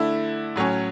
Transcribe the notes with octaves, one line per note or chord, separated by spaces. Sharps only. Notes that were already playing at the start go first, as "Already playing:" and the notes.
Already playing: D3 A3 E4
A2 F#3 C#4